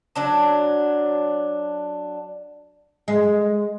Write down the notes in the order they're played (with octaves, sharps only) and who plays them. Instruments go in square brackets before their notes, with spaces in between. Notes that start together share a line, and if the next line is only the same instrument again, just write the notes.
[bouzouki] F#3 D4 A5
[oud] G#3